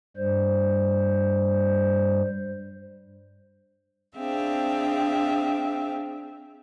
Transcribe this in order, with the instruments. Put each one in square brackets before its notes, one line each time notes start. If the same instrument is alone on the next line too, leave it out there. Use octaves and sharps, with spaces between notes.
[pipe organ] G2 G3 C5
[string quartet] C4 D4 G#4 E5 F5 G5